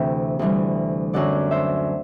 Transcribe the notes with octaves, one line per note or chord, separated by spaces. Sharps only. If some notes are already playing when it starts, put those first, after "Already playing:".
Already playing: D2 C3 E3 E5 G5
D2 C3 E3 G3
F#2 D3 F#3 D5 F#5
C5 E5